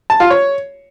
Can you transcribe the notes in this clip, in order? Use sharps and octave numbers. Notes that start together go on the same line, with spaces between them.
A5
F4
C#5